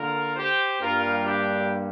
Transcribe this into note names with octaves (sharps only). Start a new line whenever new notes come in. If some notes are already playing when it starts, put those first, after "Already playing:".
Already playing: D3 A#3 F4 A#4
G4 C5
G2 G3 A#3 F4 A#4
D4 G4